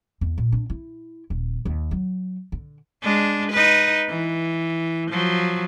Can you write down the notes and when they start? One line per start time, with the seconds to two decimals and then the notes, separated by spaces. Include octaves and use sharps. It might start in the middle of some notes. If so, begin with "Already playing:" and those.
0.21 E2
0.38 A#2
0.52 D4
0.70 E4
1.30 D#1
1.65 D#2
1.91 F#3
2.52 D3
3.03 G#3 D4
3.52 D#4 B4
4.09 E3
5.11 F3 F#3